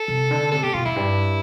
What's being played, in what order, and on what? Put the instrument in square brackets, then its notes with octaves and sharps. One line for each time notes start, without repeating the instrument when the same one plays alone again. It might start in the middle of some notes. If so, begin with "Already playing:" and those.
Already playing: [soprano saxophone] A4
[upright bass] C3
D3
[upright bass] C3 [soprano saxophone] A4
[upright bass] B2 [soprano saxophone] G4
[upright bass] B2 [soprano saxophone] F4
[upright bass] F2 [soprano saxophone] E4
[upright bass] G2